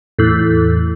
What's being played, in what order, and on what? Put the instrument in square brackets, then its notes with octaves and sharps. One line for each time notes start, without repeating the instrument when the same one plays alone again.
[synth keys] E2 A2